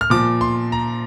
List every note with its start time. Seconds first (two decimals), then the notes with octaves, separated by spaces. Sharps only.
0.01 F6
0.10 A#2 F3 D6
0.41 C6
0.72 A#5